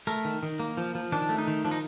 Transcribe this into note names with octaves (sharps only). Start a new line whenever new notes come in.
A3 A#4
D#3
D#3
A#3
F3
F3
D#3 D4
A3
D#4
D#3
F3 D4
D#4